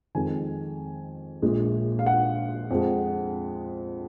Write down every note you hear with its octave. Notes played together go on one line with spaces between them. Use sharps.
F2 D#3 G#3 G#5
A#1 A#2 G#3
F5
F#5
F2 F3 G#3